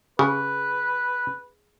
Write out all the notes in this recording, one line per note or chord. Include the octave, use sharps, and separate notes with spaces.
C#3 G#4 B4